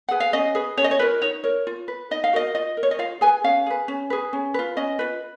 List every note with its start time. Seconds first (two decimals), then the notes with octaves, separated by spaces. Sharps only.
0.09 G#4 B4 F#5
0.20 F5
0.33 C#4 D#5
0.55 G#4 B4
0.78 C#4 C#5
0.84 D#5
0.91 C#5
0.99 F4 A#4 B4
1.22 D#4 C#5
1.44 A#4 C#5
1.67 F4
1.88 B4
2.11 D#4 D#5
2.24 F5
2.33 F#4 A#4 D#5
2.55 F4 D#5
2.77 A#4
2.83 C#5
2.91 D#5
2.99 F4 F5
3.21 G#4 B4 G#5
3.44 C#4 F5
3.66 G#4 B4
3.88 C#4
4.10 G#4 B4
4.33 C#4
4.54 F4 B4
4.77 C#4 D#5
4.99 F4 B4